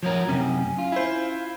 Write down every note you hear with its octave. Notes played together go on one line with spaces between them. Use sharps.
F3 F#3 A#4 C#5
F#2 C3 C#4
F4
E4 C5